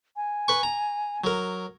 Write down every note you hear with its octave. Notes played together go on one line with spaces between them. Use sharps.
G#5
B4 C#6
A#5
F#3 A#4